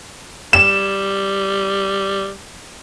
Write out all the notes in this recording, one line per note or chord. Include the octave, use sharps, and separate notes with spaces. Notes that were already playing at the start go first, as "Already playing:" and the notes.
G3 E7